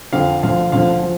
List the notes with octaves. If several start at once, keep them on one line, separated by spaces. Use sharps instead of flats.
F2 D3 F3 F5
D2 D3 F3 F5
D2 D3 F3 F5
F3